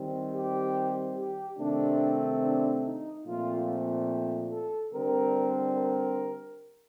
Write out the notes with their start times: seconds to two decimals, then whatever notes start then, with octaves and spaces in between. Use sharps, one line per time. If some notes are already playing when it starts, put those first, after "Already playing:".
Already playing: D#3 G3 C4
0.34 G4
1.17 G4
1.59 C3 D#3 A3 C4 D4
2.43 D4
2.84 D#4
3.26 A#2 F3 A3 C4 F4
4.51 A4
4.93 D3 G3 C4 A#4
5.76 A#4